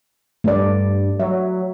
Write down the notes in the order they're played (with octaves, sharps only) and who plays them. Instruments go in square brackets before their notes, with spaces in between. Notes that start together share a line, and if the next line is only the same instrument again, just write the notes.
[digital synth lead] G2 [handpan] A3 D5
[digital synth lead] F#3 [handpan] E5